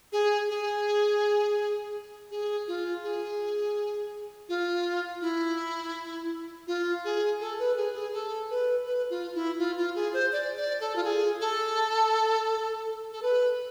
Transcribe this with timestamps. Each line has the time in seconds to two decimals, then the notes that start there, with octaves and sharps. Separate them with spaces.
0.13 G#4
0.49 G#4
2.31 G#4
2.68 F4
3.04 G#4
4.49 F4
5.21 E4
6.67 F4
7.05 G#4
7.41 A4
7.59 B4
7.77 G#4
7.95 G#4
8.13 A4
8.50 B4
8.86 B4
9.10 F4
9.35 E4
9.59 F4
9.77 F4
9.95 G#4
10.14 C5
10.32 D5
10.56 D5
10.81 A4
10.96 F4
11.04 G#4
11.41 A4
13.13 A4
13.22 B4